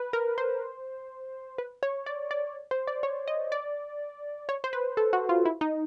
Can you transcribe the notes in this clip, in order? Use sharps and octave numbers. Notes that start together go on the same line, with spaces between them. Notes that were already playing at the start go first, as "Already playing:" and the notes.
Already playing: B4
A#4
C5
B4
C#5
D5
D5
C5
D5
C#5
D#5
D5
C#5
C5
B4
A4
F#4
F4
E4
D#4